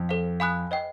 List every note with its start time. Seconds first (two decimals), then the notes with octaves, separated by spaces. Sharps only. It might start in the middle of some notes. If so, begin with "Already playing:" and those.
Already playing: F2
0.09 A4 C5 F5
0.40 F5 G#5 B5 D#6 F#6
0.71 C5 D#5 G5